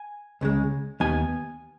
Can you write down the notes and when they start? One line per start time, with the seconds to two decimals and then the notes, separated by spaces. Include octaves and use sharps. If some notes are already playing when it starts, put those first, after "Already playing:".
Already playing: G#5
0.41 C#2 C#3 G#3
1.00 D#2 D#3 B3 G#5